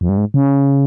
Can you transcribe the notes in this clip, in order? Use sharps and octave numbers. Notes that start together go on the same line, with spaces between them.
F2
G2
G#2
C#3